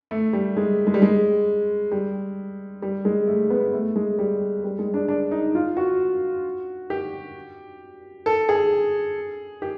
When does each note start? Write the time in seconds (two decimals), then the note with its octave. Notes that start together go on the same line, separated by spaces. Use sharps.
0.11 A3
0.33 G3
0.57 G#3
0.87 G#3
0.94 G3
1.02 G#3
1.92 G3
2.82 G3
3.05 G#3
3.27 A3
3.50 B3
3.73 A3
3.96 G#3
4.19 G3
4.64 G3
4.79 G#3
4.94 D4
5.08 D4
5.31 D#4
5.55 F4
5.77 F#4
6.90 G4
8.26 A4
8.49 G#4
9.62 G4